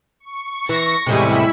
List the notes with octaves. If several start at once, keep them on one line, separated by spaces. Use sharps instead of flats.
C#6
E3 A#6
E2 A2 C3 G3 G#3 E4 E5 B5